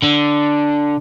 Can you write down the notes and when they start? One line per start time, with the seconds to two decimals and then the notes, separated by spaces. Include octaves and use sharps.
0.02 D3